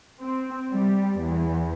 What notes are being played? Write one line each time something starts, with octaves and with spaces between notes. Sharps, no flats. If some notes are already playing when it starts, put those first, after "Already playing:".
C4
G3
E2